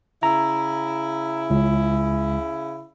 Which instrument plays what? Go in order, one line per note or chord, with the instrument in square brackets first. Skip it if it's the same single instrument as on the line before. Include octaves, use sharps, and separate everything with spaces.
[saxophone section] C#3 E4 [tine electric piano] A#5
[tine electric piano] C#2